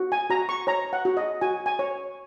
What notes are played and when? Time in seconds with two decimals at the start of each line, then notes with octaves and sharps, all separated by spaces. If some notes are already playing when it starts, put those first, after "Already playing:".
Already playing: F#4
0.12 G#5
0.30 F#4 A#5
0.49 C#6
0.67 C#5 A#5
0.93 F#5
1.05 F#4
1.17 D#5
1.41 F#4 G#5
1.66 G#5
1.79 C#5